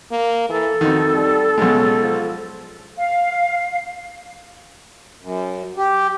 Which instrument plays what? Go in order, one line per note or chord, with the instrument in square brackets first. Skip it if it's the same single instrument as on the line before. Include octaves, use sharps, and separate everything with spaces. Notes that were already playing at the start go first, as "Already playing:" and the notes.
[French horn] A#3
[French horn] E3 [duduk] A4
[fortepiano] F2 D#3 [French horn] F#4
[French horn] G3
[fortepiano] B1 G#3 [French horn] C#3
[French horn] F3
[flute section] F5
[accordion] F#2
G4